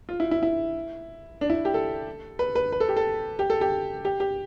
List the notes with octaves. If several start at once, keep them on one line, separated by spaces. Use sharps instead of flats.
F4
E4
E4
E4
D4
E4
G4
A4
B4
B4
B4
A4
G4
A4
G4
A4
G4
G4
G4